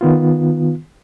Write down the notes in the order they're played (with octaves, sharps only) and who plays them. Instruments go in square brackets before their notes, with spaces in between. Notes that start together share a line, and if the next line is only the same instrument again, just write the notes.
[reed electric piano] D#3 B3 F4